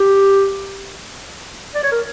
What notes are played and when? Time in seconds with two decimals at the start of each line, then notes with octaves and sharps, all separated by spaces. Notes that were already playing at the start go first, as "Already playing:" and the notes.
Already playing: G4
1.75 D5
1.83 C#5
1.92 A#4